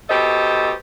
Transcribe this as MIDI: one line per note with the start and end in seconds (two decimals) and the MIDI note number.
0.09 0.71 47
0.09 0.71 67
0.09 0.71 69
0.09 0.71 72
0.09 0.71 75